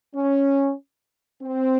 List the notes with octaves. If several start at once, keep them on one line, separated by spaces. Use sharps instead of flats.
C#4
C4